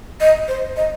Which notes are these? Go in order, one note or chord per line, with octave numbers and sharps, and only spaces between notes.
D#5
C5
D#5